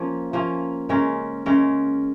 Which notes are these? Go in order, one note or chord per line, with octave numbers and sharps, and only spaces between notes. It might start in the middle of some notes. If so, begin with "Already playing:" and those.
Already playing: F3 A#3 C#4
F3 A#3 C#4
C#3 G#3 C#4 A#4
C#3 G#3 C#4 A#4